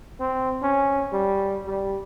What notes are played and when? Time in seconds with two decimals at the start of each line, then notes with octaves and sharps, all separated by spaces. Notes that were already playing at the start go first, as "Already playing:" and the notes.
0.20 C4
0.63 C#4
1.13 G3
1.66 G3